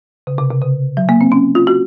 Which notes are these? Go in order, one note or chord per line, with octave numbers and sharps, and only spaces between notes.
C#3
C3
C3
C#3
F#3
A#3
C4
C#4
F4
F#4